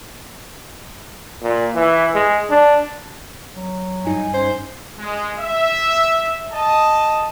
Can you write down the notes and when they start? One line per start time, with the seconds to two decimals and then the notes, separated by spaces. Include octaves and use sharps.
1.43 A#2
1.75 E3
2.15 G#3
2.50 D4
3.56 F#3
4.05 G2 D#4 G#5
4.34 C#4 C5
4.99 G#3
5.38 E5
6.51 D#5 A5